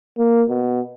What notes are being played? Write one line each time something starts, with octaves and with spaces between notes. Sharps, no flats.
A#3
B2